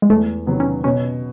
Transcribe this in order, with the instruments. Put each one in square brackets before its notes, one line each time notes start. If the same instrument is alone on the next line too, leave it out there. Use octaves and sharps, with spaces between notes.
[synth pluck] G#3
[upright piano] E2 [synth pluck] A3
[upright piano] C3 D#3 F#3 B3
[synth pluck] C#4
[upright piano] B2 [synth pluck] C#4